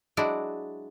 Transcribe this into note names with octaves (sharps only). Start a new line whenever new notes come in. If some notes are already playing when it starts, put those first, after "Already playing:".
F#3 G#3 D4 E4 F#4